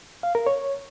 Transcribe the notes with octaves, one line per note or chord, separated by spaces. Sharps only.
F5
A#4
C#5